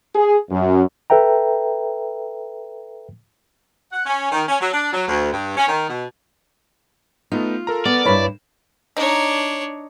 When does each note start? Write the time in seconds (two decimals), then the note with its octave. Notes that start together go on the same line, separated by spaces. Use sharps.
0.15 G#4
0.51 F#2
1.10 A4 B4 E5 G5 A#5
3.92 F#5
4.06 C#4
4.32 D#3
4.48 C#4
4.60 F#3
4.73 D4
4.92 F#3
5.07 D2
5.32 G2
5.56 C#4
5.68 D#3
5.89 B2
7.32 A3 B3 D#4 F4
7.67 A4 A#4 A#5
7.85 B3 D5
8.05 G2 E4 B4 C#5 B5
8.97 D4 D#4 C#5